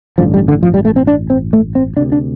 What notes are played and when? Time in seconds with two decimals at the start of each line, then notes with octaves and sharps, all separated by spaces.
0.18 A1 G2 D3 F3
0.34 G3
0.48 D3
0.63 F3
0.74 G3
0.85 A3
0.96 C4
1.07 D4
1.30 C4
1.53 A3
1.75 C4
1.97 D2 C3 D4
2.12 D4